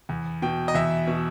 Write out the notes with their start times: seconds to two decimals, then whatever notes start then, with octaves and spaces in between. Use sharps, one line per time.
0.09 E2
0.42 B2 G5
0.68 D#5
0.74 E2 E5
1.07 B2